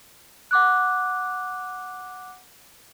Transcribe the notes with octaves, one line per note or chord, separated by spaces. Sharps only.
F#5 D6 F#6